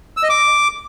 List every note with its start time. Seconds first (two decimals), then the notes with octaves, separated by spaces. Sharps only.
0.17 E6
0.23 D#5
0.29 D6